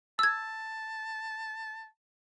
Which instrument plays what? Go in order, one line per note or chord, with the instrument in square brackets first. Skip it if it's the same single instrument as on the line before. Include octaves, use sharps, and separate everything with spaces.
[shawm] A5 [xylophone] E6 G#6